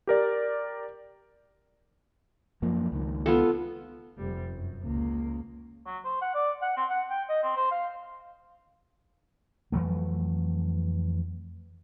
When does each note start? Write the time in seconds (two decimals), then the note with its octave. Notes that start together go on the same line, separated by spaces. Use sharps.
0.07 G4 A#4 D5
2.62 F#2 F3 A#3
2.92 C#2 D#3
3.26 B3 F4 A4
4.18 F1 G3
4.51 F#2
4.83 C#2 A#3
5.86 F#3
6.04 C5
6.21 F#5
6.34 D5
6.62 F#5
6.76 C4
6.89 F#5
7.10 G5
7.29 D#5
7.43 C4
7.56 C5
7.71 F5
9.72 F2 E3 F#3 A3